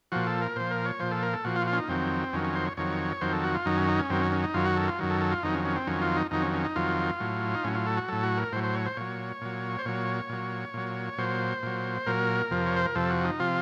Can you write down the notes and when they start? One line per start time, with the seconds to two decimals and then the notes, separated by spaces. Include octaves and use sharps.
0.12 A#2 F3 F#4
0.27 A4
0.41 A#4
0.56 A#2 F3 C5
0.71 A#4
0.85 C#5
1.00 A#2 F3 C5
1.11 A4
1.23 A#4
1.33 A4
1.45 A#2 F3 F#4
1.56 F4
1.62 F#4
1.67 F4
1.73 C#4
1.77 D#4
1.89 F2 D#3 F#3 C4
2.33 F2 D#3 F#3 C#4
2.44 C#4
2.55 C5
2.66 C#5
2.77 F2 D#3 F#3 C#5
3.21 F2 D#3 F#3 C5
3.33 A4
3.44 F#4
3.55 F4
3.65 F#2 D#3 F#3 D#4
3.77 C#4
3.88 D#4
3.99 C#4
4.10 F#2 D#3 F#3 C4
4.21 C#4
4.32 C#4
4.44 D#4
4.54 F#2 D#3 F#3 F4
4.66 F#4
4.76 A4
4.88 F4
4.99 F#2 D#3 F#3
5.10 A4
5.21 A4
5.32 F4
5.43 F2 D#3 F#3 D#4
5.54 C#4
5.65 C#4
5.76 C4
5.87 F2 D#3 F#3 C#4
6.02 F4
6.17 D#4
6.31 F2 D#3 F#3 D#4
6.42 C#4
6.54 C#4
6.65 D#4
6.76 F2 D#3 F#3 F4
7.20 A2 F#3
7.55 D#4
7.64 A2 F#3 C#4
7.75 F4
7.86 A4
7.97 F#4
8.08 A2 F#3 A4
8.23 F#4
8.37 A#4
8.52 A2 C5
8.56 F#3
8.63 C5
8.75 C#5
8.86 C5
8.97 A#2 F#3 C#5
9.41 A#2 F#3
9.79 C5
9.86 A#2 F#3 C#5
10.30 A#2 F#3
10.74 A#2 F#3
11.18 A#2 F#3 C5
11.63 A#2 F#3
12.06 A#2 F#3 A#4
12.51 F2 C3 F3
12.66 C#5
12.76 C5
12.86 A#4
12.95 F2 C3 F3 A4
13.10 F#4
13.24 D#4
13.39 C3 F3 F4